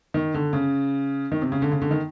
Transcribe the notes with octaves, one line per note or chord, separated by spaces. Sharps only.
D#3
D3
C#3
D#3
C3
C#3
D3
C#3
D3
D#3